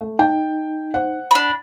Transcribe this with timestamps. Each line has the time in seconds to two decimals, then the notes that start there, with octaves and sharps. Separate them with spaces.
0.01 A3
0.19 D#4 G5 A5
0.94 C5 F#5
1.31 D4 B5